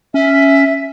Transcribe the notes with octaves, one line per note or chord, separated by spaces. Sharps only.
C#4 E5